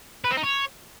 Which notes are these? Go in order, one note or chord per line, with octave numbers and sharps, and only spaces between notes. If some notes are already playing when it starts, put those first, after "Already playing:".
B4
C4
D#4
C#5